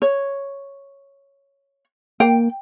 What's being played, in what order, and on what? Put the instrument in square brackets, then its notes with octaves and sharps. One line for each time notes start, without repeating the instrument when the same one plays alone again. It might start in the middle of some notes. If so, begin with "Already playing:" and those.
[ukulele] C#5
[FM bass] A#3 [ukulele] G5